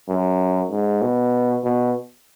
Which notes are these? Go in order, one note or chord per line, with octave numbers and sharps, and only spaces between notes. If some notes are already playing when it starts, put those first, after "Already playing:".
F#2
G#2
B2
B2